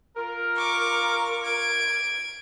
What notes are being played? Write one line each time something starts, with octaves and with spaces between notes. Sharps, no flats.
F4 A#4
C#6 D6
G#6 D7